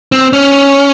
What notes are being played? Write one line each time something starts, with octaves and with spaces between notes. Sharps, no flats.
C4
C#4